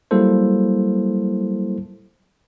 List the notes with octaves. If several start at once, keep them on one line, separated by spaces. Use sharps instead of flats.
F#3 G3 A#3 E4 A4 C5